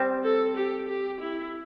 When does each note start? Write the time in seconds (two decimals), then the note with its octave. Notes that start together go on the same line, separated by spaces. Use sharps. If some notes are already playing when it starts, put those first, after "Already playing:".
Already playing: G3 C4
0.24 A4
0.57 G4
0.88 G4
1.21 E4